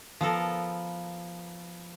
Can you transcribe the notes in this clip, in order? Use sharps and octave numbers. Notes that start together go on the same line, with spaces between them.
F3 B3 A4 A#4